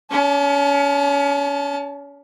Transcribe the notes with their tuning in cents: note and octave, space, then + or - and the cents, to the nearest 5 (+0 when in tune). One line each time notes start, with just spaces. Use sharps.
C#4 +30 A5 +0